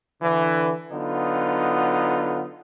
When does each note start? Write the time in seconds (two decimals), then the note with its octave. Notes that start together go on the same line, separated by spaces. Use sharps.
0.22 D3 E3
0.92 D3 F#3 B3 D#4 F4